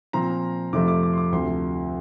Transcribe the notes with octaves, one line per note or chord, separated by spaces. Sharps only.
A#2 F3 C4 A#5
F2 C3 F3 A3 D6
D6
D6
C6
D6
D2 C3 F3 C6